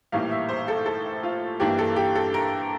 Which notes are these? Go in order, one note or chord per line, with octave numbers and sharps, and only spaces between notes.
A#1 A2 E3 G3 A#3 F5
E5
C5
A4
A4
F4
G2 E3 A#3 D4 G4
A4
G4
A4
A#4